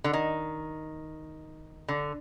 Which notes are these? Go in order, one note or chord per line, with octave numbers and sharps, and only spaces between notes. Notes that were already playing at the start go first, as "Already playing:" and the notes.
D3
D#3
D3